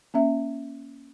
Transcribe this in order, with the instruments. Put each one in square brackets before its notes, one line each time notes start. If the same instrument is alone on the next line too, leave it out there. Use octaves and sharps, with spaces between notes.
[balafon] A#3 C#4 E5